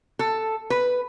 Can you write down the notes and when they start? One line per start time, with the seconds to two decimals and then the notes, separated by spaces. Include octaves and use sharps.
0.19 A4
0.70 B4